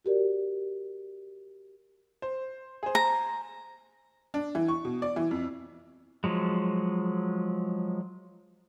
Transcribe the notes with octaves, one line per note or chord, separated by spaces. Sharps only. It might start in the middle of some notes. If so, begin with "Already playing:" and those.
F#4 G4 A#4 D5
C5
G#4 C5
A#5
D4
E3
C#6
B2
D5
E3
F2
F3 F#3 G#3